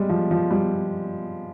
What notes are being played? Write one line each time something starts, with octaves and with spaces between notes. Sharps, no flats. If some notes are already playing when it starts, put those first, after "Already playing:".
Already playing: G3 G#3
F3
F3
G3